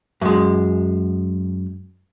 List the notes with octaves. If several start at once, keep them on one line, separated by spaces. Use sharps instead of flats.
F#2 G#3